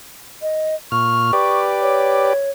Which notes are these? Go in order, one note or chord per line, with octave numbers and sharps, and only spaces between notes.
D#5
A#2 C#6 F6
G4 B4 D5
C#5